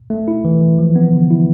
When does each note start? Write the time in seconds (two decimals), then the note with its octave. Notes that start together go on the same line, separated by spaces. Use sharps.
0.10 A3
0.28 E4
0.45 E3
0.61 E3
0.79 F3
0.96 B3
1.13 D3
1.31 E4